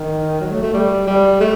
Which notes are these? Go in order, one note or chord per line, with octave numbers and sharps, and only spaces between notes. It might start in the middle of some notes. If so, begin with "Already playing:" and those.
Already playing: D#3
F#3
A3
A3
G3
G3
A3